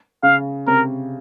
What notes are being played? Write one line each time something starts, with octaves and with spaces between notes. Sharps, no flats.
C#3 F5
C3 A#4